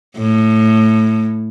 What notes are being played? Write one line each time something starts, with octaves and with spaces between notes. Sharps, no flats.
A2